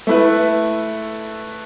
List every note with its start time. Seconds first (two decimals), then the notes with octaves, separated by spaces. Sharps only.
0.07 A3 E4 B4